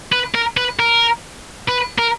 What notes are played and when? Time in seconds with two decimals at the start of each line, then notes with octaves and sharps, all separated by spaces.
0.12 B4
0.35 A#4
0.57 B4
0.80 A#4
1.69 B4
1.99 A#4